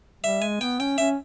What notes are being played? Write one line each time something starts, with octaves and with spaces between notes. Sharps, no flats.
G3 E5
G#3 G#5
B3 G5
C#4 G5
C#4 E5